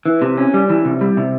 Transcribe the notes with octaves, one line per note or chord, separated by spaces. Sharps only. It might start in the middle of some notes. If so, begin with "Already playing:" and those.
E3
C3
C#4
G3
E3
C3
G3
C3